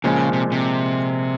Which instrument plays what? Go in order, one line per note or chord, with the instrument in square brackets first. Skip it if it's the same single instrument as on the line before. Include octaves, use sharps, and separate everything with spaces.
[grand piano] A#2 F3 G#3 [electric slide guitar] C#3
[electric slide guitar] C3
C3